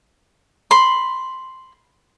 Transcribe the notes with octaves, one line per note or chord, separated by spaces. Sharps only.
B5 C6